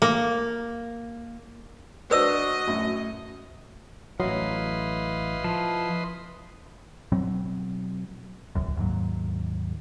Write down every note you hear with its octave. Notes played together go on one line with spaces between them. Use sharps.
A#3
D4 F#4 B4 C5 D5 D#5 D#6 E6
F#2 A2
A1 F#3 E4 B4 D#5 F5 C6
F3
B2 F#3 C4
D#1 C#2 F#2
D#2 G#2 F#3